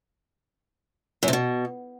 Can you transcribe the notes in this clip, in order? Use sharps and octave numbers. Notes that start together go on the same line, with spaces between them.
F#2
C3
B2